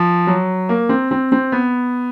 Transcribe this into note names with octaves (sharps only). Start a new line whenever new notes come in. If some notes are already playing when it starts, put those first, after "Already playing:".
Already playing: F3
F#3
A#3
C4
C4
C4
B3